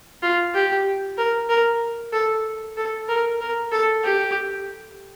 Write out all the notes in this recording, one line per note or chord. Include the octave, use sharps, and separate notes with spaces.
F4
G4
A#4
A#4
A4
A4
A#4
A#4
A4
G4